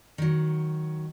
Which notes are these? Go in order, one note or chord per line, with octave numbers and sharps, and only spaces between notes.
D#3 F#3